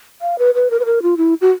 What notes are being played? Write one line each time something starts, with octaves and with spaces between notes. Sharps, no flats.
F5
B4
B4
A#4
B4
A#4
F4
E4
F#4